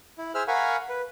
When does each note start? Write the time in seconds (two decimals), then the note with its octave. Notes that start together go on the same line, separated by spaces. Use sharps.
0.18 E4
0.35 G#4 C5 E5 E6 F6
0.48 A#4 F5 F#5 G#5 B5 C#6
0.89 B4